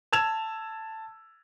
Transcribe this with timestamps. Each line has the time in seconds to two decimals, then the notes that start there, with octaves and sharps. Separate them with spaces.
0.13 A5 E6 G#6 E7 F7